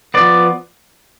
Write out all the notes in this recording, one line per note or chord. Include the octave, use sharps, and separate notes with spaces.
F3 B3 D5